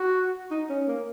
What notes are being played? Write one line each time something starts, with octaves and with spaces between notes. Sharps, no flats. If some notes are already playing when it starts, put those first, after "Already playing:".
Already playing: F#4
D#4
C#4
A#3